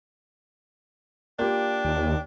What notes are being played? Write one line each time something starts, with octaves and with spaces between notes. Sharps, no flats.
A#3 D4 F4 G4 G5
D#2